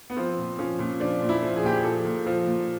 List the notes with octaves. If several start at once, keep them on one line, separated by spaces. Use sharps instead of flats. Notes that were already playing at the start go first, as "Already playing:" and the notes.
B3
F3 C4
A#2
F3 C#4
A#2
F3 D4
A#2
E4
F3
G#4
A#2 G4
G#4
F3 A4
A#2
F3
A#2